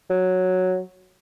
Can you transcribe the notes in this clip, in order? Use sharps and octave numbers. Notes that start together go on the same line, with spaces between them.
F#3